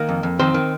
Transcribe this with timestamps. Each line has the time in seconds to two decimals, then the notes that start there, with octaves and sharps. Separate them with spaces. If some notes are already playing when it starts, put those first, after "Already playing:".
Already playing: D#3 A#3 A#4
0.09 F2
0.23 F2
0.39 D#3 C4 C5
0.54 D#3